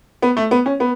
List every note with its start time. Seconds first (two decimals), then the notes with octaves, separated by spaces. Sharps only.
0.22 B3
0.37 A3
0.51 B3
0.66 C#4
0.80 B3